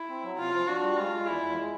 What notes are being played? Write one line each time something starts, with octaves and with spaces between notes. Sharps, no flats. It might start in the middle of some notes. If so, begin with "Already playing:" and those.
Already playing: E4
C4
F#3
C3 F4
F3
D4 F#4
G3
G#3 F4
G#3
E2 E4
E2
G#3